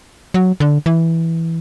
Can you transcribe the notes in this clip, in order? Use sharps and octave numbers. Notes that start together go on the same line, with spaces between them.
F#3
D3
E3